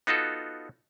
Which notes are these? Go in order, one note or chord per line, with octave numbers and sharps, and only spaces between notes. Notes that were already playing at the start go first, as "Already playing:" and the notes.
B3 D#4 F4 F#4 A4